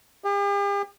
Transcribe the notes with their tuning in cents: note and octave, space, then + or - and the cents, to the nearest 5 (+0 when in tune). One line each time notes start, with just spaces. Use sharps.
G4 +45